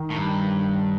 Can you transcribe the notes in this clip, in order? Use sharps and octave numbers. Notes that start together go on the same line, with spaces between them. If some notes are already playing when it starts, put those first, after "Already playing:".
Already playing: D#3
A2
G2